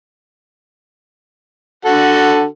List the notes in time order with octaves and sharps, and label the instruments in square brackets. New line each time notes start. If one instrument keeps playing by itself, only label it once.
[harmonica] D3 F#4 A4